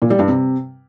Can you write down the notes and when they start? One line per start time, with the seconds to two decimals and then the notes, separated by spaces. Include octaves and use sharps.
0.02 A#2
0.10 G3
0.19 G2
0.28 C3